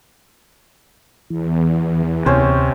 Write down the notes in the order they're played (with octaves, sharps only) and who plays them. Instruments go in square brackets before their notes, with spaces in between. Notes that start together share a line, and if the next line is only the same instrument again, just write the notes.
[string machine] E2 [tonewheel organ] E3
[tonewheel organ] D2 G#5 [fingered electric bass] C3 [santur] C#4 C5